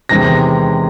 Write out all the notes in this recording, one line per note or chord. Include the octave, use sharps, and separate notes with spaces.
E2 C3 D#3 G#3 A#6